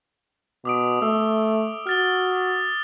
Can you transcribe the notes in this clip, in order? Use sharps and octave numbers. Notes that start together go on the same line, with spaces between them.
B2 D6 D#6 D7
A3 E6
F#4 F6 A6 G7
D6